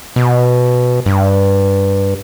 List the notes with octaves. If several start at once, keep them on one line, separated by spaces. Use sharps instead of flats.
B2
G2